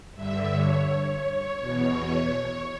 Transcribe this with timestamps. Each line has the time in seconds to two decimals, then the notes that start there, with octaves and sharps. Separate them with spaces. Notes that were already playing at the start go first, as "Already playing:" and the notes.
0.14 G2 D3 E5
0.50 C#5
1.59 E2 B2
2.32 C#5